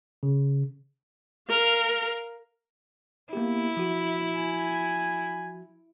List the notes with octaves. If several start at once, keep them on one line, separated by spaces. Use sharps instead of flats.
C#3
A#4 F5
A#3 B3 E4 G4
F3 F#4
G#5